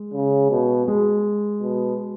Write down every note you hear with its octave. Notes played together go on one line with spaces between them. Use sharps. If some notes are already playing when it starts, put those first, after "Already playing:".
Already playing: G#3
C#3
B2
G#3
B2